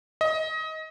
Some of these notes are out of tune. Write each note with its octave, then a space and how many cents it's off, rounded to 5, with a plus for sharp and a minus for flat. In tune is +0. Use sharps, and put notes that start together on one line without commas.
D#5 +25